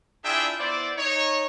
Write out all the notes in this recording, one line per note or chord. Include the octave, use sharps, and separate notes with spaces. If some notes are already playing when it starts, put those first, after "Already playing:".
D4 E4 F4 G#4 E5 G5
B3 E4 C5 D5
D#4 C#5